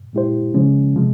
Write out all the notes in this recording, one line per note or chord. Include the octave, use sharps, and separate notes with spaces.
A#2 G#3 E4 G4 C5
C#3 F3 G#3 C#4
C3 F3 G#3